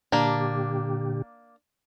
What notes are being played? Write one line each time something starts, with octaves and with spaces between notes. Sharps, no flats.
A#2 D3 A#3 D4 G4